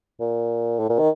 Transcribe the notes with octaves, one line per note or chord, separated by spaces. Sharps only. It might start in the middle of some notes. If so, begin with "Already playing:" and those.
A#2
A2
A#2
D#3